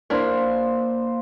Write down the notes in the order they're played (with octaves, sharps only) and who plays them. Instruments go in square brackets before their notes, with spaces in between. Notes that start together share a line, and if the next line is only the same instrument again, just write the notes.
[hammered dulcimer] A#3 C5 [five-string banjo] D4 E4 A#4